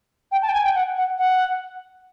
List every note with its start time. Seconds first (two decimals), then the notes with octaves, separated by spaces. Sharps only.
0.32 G5
0.42 A5
0.49 G5
0.53 G#5
0.64 G5
0.75 F#5
0.97 F#5
1.18 F#5